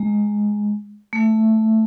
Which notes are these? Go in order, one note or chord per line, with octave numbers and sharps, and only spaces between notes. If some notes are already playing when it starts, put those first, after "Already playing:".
Already playing: G#3
A3